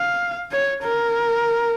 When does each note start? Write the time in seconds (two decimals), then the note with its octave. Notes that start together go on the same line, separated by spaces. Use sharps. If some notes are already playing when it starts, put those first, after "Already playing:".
Already playing: F5
0.52 C#5
0.83 A#4